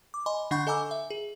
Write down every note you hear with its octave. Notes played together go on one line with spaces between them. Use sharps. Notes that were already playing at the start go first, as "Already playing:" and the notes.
D6
D#5 G#5 B5 C6
D3 D4 F#5 B5 C#6 G6
A4 D#5 G#5 A#5 D6 E6
E5
G#4